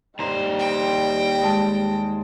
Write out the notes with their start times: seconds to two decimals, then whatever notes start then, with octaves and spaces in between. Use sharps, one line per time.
0.19 D#2 G3 C5 A#5
0.59 G5 A#6
1.41 G#3 A5